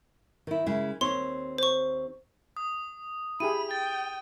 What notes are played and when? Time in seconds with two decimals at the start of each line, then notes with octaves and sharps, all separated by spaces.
0.47 D#3 E4
0.66 C#3 G#3 E4
1.01 D#2 C4 C#5 C6
1.58 C5 C#6
2.57 D#6
3.40 E4 G4 G#4 B5 D#7
3.71 G5 A6